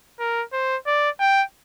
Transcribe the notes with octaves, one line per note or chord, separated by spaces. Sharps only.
A#4
C5
D5
G5